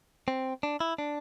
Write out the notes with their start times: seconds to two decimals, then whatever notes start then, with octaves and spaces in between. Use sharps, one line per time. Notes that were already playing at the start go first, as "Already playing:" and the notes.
0.28 C4
0.63 D4
0.80 E4
0.98 D4